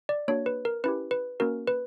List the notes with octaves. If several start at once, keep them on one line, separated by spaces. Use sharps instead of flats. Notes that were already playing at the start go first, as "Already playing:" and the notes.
D5
A#3 D4 F#4 C#5
B4
A#4
C#4 E4 G4 B4
B4
A#3 C#4 F#4 A#4
B4